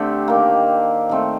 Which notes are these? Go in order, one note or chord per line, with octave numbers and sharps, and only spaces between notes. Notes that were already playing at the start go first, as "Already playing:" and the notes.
Already playing: D3 A3 C4 G4
D#3 A#3
D#3 A3 C4